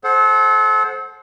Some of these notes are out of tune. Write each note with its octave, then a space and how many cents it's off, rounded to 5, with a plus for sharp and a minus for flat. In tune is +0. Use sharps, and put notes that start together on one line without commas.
A4 -35 C5 +10 F#5 +0